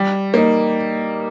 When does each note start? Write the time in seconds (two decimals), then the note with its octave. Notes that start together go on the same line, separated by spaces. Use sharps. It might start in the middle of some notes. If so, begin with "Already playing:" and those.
Already playing: G3
0.34 A#3 D#4